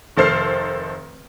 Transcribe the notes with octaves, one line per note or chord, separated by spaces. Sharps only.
F1 D#3 A4 C5 F6 C7